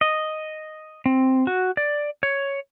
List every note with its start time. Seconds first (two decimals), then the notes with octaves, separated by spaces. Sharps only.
0.01 D#5
1.06 C4
1.47 F#4
1.77 D5
2.23 C#5